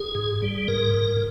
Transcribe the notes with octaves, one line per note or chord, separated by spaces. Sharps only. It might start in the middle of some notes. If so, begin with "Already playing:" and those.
Already playing: G#4
G#2
G3
G#2 A#4
G#2